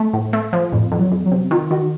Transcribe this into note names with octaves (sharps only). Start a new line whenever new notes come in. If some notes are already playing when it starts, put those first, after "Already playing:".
Already playing: A3
A2
A3
F3
F2 A2
F2
F#3
F2
F#3
C3
D#3 F4
D#3 F#4